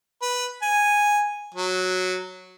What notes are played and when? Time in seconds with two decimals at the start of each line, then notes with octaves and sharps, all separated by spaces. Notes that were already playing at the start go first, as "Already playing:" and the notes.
0.22 B4
0.62 G#5
1.54 F#3